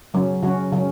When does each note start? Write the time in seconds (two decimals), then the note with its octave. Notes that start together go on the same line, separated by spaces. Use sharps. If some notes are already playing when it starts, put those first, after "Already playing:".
0.14 C#3 F#3 C#4
0.43 C#3 F#3 C#4 F#4
0.72 C#3 F#3 C#4